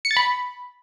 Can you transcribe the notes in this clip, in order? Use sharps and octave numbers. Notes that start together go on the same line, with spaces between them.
C#7
A6
B5